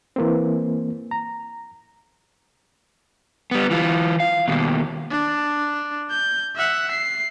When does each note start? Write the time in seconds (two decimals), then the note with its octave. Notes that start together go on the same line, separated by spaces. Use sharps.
0.16 E3 A#3 C4
1.11 A#5
3.51 G3 B3
3.71 E3 F4
4.20 F5
4.48 D#2 B2
5.11 D4
6.11 G6
6.56 E5 F#5
6.91 C7